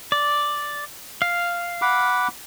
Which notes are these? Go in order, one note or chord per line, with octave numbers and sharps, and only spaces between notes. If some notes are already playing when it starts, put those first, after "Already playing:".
D5
F5
F#5 B5 D6